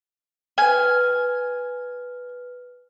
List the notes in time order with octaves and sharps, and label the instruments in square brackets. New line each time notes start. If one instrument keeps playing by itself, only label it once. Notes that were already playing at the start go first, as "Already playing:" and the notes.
[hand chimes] B4 F6 [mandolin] G#5